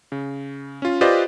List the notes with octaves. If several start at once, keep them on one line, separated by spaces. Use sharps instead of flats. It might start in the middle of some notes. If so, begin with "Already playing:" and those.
C#3
C#4 F4
F4 G4 B4 C5 D5 D#5